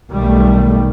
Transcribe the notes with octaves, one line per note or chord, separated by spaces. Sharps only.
B1 D#3 G3 A3